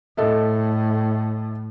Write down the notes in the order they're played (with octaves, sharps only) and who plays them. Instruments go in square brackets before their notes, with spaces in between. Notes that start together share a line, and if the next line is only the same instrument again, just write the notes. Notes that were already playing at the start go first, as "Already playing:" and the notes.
[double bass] A2 [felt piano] A4 D#5 E5